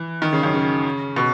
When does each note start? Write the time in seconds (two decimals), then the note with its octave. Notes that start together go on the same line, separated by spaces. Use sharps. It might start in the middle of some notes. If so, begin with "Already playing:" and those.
Already playing: E3
0.22 D#3
0.33 C#3
0.43 F#2
0.53 C#3
1.16 B2